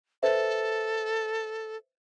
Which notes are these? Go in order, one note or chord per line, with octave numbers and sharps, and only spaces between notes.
A4 B4 C5 E5